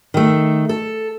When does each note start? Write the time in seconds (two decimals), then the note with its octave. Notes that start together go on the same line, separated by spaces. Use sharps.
0.14 D#3 A3
0.69 A4